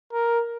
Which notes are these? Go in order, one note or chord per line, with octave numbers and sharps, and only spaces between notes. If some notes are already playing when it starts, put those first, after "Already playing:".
A#4